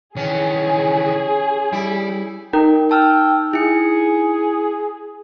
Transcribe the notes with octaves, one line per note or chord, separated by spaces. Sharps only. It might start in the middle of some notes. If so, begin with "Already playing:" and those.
D#3 E3 C#4 G#4
G3 E4
D#4 A#4 G5
G5 A5 E6 F6
E4 G#4 C#7